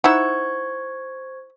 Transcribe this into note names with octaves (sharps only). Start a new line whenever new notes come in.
D#4 E4 C5 F#5 C#6 E6 G#6